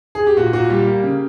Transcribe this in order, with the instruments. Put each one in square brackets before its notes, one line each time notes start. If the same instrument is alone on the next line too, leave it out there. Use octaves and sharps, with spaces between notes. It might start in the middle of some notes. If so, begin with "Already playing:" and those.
[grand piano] G#4
G4
A#2 F#4
A#2 F#4
G3 G4
A#3
C#3